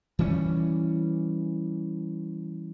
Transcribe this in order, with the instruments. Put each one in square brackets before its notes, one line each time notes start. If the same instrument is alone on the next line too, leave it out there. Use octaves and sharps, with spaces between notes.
[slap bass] E3 G3 C#4